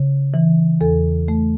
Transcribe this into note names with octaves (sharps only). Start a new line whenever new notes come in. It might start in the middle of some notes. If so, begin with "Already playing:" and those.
Already playing: C#3
E3
E2 A4
A3